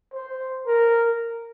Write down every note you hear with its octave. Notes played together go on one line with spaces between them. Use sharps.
C5
A#4